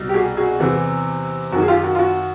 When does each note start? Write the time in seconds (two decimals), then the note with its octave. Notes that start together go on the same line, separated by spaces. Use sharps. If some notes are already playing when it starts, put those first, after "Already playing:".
Already playing: C2 B2
0.09 G4
0.14 F#4 G#4
0.37 F#4 G#4
0.60 E2 C3 E3
1.52 F#2 F#4
1.56 D#3
1.62 G#4
1.68 F4 G4
1.84 F#4
1.95 F4
1.99 F#4